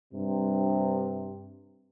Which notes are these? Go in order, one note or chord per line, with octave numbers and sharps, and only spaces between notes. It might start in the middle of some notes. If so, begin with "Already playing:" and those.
G2 C3